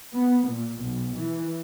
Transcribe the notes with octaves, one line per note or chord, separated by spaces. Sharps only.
B3
A#2
B1
E3